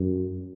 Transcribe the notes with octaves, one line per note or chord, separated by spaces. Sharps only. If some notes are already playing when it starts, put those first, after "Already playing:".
Already playing: F#2